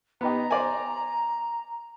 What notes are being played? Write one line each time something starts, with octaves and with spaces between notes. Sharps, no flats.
B3 D#4 G4 A#5
C5 D5 G#5